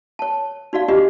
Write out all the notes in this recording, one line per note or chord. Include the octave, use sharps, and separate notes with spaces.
C#5 A5
D#4 F#4 D5 F5
D4 F4 G4 D#5